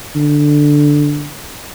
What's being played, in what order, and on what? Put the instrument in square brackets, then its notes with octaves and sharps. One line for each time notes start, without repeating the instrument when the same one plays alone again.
[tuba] D3